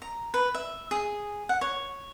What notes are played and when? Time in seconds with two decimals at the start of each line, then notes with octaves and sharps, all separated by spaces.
0.02 A#5
0.34 B4
0.55 E5
0.91 G#4
1.49 F#5
1.61 C#5